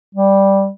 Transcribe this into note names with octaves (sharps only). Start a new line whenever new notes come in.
G3